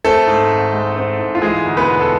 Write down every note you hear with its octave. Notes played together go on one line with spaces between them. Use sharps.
A3 C4 A4
G#2
G#1
G#3
C4
G#2
F4
E3 G#3 G#4
D2
B3 B4
E1
A4